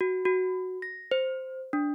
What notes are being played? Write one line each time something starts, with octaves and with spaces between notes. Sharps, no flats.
F#4
F#4
A#6
C5
D4